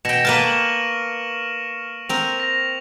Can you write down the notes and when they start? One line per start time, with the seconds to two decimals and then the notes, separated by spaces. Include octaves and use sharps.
0.05 B2 G5 A#6 C#7 E7
0.25 A#3 B4 A5 F6 D7 D#7
0.44 C#6 E7 F#7
2.09 C4 A#4 F7
2.40 A#6